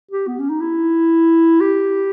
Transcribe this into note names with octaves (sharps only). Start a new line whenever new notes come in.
G4
B3
C#4
D#4
E4
G4